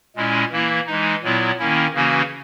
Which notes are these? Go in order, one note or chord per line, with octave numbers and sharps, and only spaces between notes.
A#2 G#3 C#4 E4
E3 A#3 E4
E3 G#3 D#4
A#2 F#3 B3 E4
D#3 A#3 C#4 E4
C#3 E3 A#3 C#4 F#4